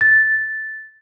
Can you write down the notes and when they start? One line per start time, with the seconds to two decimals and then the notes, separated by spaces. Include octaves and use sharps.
0.01 A6